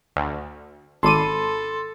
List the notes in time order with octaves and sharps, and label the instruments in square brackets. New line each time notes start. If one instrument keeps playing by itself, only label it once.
[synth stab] D2
[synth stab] G#1 D#7 [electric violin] A4 [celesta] A5 B5 D6 [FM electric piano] C6